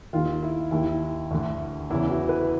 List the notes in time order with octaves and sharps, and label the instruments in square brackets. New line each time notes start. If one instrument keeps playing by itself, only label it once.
[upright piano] D#2 D#3 F4
E4
D#2 D#3 E4
D2 D3
E2 C#3 E3 E4
F#4
B4